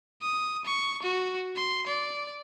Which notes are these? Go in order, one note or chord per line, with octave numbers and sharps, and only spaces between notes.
D#6
C#6
F#4
C6
D5